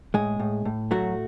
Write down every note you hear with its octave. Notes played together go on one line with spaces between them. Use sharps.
A2 G#3 G#4
A2
A2
F#3 A3 F#4